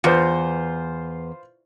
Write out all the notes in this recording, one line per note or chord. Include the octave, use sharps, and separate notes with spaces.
E2 F4 B4 C5